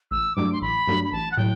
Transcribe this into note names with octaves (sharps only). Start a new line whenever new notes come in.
A1 E6
G2 F#3 A3 D4 D6
C6
A1 B5
G2 F#3 A3 D4
B5
A1 A5
F#5
A2 F#3 G5